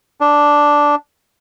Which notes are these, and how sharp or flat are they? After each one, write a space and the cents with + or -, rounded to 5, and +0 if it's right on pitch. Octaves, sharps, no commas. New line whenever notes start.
D4 -5